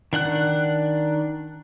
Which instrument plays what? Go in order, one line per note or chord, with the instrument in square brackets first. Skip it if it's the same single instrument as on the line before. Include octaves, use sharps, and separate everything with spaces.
[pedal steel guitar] D#3 D4 F#5 F#6